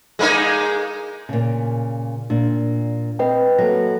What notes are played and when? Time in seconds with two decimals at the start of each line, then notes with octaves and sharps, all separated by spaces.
0.19 G#3 A#3 D#4
1.29 A#2 C#3
2.30 A#2 D4
3.19 C4 B4 D#5 G5
3.58 F#3 A#3 A4 A#6